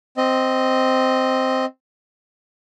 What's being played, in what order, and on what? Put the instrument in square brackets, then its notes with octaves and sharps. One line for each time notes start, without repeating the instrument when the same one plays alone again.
[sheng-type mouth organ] C4 D#5